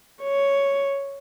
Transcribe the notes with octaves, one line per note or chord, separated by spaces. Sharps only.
C#5